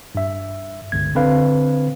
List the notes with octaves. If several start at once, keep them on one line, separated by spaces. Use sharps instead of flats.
G2 E5
G1 C#2 G#6
D3 C4 B4 F5